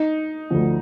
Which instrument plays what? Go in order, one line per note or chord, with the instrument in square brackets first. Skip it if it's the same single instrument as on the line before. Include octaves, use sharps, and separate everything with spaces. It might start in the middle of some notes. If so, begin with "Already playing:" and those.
Already playing: [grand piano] D#4
[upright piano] D2 D3 F3